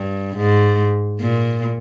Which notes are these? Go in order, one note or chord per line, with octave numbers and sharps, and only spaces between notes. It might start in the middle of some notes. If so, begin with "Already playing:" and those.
Already playing: G2
G#2
A#2